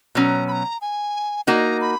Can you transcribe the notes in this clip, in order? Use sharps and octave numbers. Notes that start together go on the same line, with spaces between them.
B2 F#3 C#4 A#5
B5
A#5
G#5
A#3 D#4 F#4 A#5
B5